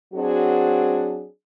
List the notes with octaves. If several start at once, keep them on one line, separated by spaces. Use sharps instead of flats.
F#3 C4 D4 F#4 G#4